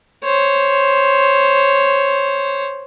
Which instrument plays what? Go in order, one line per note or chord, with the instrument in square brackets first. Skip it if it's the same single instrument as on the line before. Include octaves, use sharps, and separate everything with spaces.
[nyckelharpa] C5 C#5